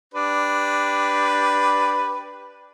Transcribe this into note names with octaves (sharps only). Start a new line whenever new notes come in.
D4 G4 B4